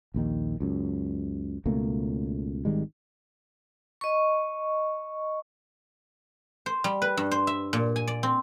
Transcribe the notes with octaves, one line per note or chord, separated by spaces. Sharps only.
A#1 D#2 D#3
C#2 F#2
C#2 B2 A3 A#3
G#1 D#3 G3 G#3
D#5 C#6
C5
G3
B4
G2
C5
E5
A#2
G#5
D5
C4